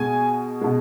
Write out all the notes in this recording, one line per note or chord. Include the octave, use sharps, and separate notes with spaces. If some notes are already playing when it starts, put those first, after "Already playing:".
Already playing: B2 G#3 G#5
B2 G#3